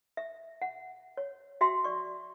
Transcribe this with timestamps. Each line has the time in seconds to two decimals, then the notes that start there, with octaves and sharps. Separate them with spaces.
0.17 E5
0.62 F#5
1.17 C#5
1.61 F#4 E5 G5 C6
1.84 D5 C#6